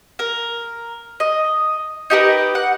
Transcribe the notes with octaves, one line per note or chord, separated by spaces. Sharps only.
A#4
D#5
D#4 G4 A#4 B4
F#5